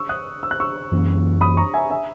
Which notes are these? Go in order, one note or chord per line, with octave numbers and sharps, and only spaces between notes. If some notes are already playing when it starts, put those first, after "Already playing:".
Already playing: C#6 E6
D#6 F#6
E6
F#6
C#6 E6
F#2 E3 A#3 C#4
B5 D#6
A#5 C#6
E5 G#5
E5 G#5